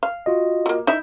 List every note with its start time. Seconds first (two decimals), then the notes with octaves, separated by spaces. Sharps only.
0.03 F5
0.26 F4 F#4 D#5
0.66 A3 A#3
0.87 D#4 E4 E5 G6